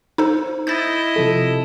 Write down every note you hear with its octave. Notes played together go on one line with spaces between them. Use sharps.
D#4 A4 C5
E4 D#5 G6 A6
C3 F3 A4